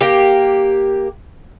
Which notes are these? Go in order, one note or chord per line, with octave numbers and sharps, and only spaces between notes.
A#3 G4